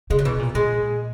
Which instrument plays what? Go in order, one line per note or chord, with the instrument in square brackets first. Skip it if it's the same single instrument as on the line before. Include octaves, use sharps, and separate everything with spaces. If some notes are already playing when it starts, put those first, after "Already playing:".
[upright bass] C#3 [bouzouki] G#3
[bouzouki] F#3
[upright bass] B2 [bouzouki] E3
[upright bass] A#2
[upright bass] A#2 [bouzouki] G#3